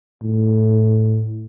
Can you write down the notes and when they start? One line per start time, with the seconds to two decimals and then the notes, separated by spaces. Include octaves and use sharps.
0.23 A2